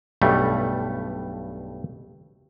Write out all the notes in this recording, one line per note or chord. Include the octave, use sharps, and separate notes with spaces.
B1 G2 G3 A3